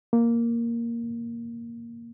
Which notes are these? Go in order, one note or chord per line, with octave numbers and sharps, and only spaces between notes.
A#3